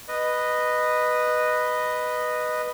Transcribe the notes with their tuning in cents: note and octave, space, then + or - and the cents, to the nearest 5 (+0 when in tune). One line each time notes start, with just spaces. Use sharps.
B4 +0 D#5 -10